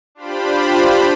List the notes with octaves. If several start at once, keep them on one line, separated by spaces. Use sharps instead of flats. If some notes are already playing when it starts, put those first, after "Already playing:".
D4 F4 G4 C5 B5